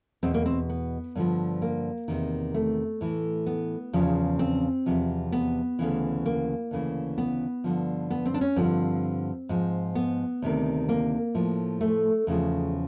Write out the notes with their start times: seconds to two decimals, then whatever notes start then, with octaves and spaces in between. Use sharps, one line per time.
0.23 E2 B2 C4
0.34 A#3
0.46 C4
0.69 B3
1.15 G2 D3 F3
1.62 A#3
2.08 E2 C3 D#3
2.54 A3
3.01 A2 E3
3.47 B3
3.93 E2 C#3 F3
4.39 C4
4.86 E2 C3 F3
5.32 B3
5.79 D2 C#3 E3
6.26 A#3
6.71 D2 C#3 E3
7.18 B3
7.64 G2 D3 F3
8.10 B3
8.26 C4
8.34 D4
8.41 C#4
8.56 G2 D3 F3 C4
9.49 G#2 F3
9.95 B3
10.42 D2 C3 D#3
10.89 A#3
11.35 A2 F3
11.81 A3
12.27 E2 C#3 F3